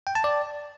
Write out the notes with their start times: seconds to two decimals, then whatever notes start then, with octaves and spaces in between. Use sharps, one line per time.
0.07 G5
0.15 A5
0.24 D5